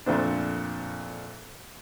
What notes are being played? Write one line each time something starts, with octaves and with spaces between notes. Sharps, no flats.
F2 A#2 A3 C4 D4